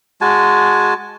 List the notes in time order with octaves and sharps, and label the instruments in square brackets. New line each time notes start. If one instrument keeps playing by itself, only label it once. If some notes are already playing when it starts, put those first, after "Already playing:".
[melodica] G#3 F#4 G#5 A5